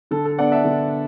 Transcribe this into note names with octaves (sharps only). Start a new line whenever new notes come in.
D3 A4
A4
B3 D4 D5 F#5
E5 A5
D3